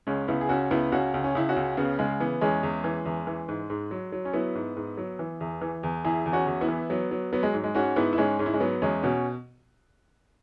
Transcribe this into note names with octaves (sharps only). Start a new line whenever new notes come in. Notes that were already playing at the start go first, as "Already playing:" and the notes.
C#2 G#3 C#4
C#2 B3 E4
G#4
C#2 C#4 F#4
C#2 B3 E4
C#2 C#4 F#4
C#2
C#4
C#2 E4
C#4 F#4
C#2
C#3 B3
C#3 G#3
E3 B3
E2 G#3 C#4
E2
E3
E2
E3
G#2
G#2
F#3
F#3
C#4
F#3 B3 E4
G#2
G#2
F#3
E3
E2
E3
E2
E2 E4 G#4
E2
C#4 F#4
E2
B3 E4
E3
F#3 B3
F#3
F#3 B3
G#3
G#2
G#3
G#2 C#4 F#4
G#2 B3 E4
E4
G#2 G#3 C#4
G#2 C#4
E4
G#3 C#4
F#3 B3
E2 G#3 C#4
B2 C#4 F#4